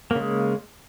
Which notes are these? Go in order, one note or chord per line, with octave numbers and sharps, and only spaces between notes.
C#3 G#3 A#3